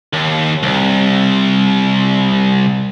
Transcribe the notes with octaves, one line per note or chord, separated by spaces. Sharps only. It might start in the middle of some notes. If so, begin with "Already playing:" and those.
D#2
C2